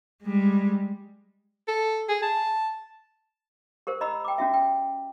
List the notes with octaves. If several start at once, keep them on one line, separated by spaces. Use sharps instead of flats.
G3 G#3
A4
G#4
A5
G4 A#4 C5
D#5 A#5 B5 E6
G5 D6
C#4 F#4 E5
G5